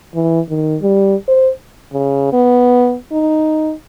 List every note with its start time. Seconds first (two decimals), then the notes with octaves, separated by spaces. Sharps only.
0.15 E3
0.50 D#3
0.82 G3
1.28 C5
1.93 C#3
2.32 B3
3.12 D#4